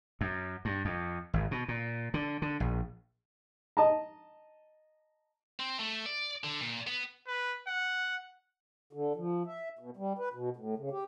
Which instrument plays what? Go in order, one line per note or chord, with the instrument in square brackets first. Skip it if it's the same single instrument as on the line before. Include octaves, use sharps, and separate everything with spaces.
[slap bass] F#2
G2
F2
G#1
B2
A#2
D3
D3
A#1
[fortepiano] D#5 A5 A#5
[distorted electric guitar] C4
A3
D5
D3
A#2
B3
[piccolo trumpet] B4
F#5
[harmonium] D3
F3
E5
B2
G3
B4
B2
A2
C#3
G4